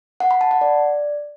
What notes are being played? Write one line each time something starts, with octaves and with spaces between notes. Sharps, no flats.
F#5
B5
A5
F#5
D5